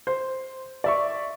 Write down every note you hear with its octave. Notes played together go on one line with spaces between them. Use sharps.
C5
D5 E5 C#6